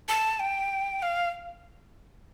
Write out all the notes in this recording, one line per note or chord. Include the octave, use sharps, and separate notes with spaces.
A5
G5
F5